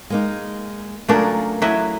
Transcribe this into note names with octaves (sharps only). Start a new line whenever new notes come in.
G#3 A#3 D#4
C#3 F#3 A3 D4 F4 A#4
F#3 E4 D#5